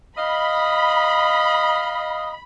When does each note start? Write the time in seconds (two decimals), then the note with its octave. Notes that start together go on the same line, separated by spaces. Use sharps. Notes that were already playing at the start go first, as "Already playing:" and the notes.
0.18 D#5 F5 B5